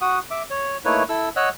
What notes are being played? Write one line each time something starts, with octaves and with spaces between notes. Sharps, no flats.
F#4 F#5 D#6
E5 D6
C#5
A3 A#3 D#4 E4 B4 C#5
E4 A4 E6
C#5 D#5 F#5 E6 F#6